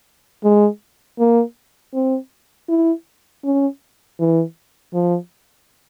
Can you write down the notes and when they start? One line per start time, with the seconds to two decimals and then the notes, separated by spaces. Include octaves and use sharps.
0.44 G#3
1.19 A#3
1.94 C4
2.69 E4
3.44 C#4
4.20 E3
4.94 F3